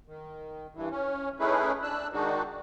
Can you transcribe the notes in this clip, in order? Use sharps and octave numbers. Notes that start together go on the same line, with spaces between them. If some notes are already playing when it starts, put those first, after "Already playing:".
D#3
G2 E3
C#4
A3 C#4 D#4 E4 G#4 B4
D4 E6 F#6
D#3 G#3 D4 D#4 F#4